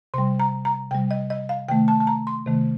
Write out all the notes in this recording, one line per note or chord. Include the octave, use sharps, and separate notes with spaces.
C3 G3 C6
A#5
A#5
C3 G3 G5
D#5
D#5
F5
C3 D#3 A3 G5
A5
A5
A#5
C6
C3 D#3 A3